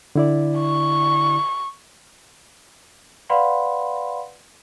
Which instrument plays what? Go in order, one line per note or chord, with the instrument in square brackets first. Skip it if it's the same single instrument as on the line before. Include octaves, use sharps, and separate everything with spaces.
[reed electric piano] D3 E4 D5
[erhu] C#6
[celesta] B4 D5 F5 F#5 B5 C6